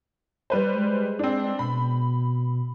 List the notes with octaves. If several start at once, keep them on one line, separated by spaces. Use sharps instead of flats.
G3 B4 C5
G#3
C4 D4
B2 B5